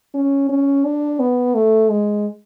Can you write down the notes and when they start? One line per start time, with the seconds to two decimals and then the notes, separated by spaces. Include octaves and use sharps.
0.14 C#4
0.49 C#4
0.85 D4
1.20 B3
1.55 A3
1.90 G#3